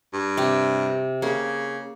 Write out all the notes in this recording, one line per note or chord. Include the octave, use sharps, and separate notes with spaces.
G2
C3 G4
C#3 A#3